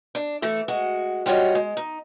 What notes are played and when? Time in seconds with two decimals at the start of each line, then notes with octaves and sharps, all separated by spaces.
0.15 D4
0.42 E3 A3 A4
0.68 G#3 F#4
1.26 G3 F4 F#4 C#5 D#5
1.55 G#3
1.77 D#4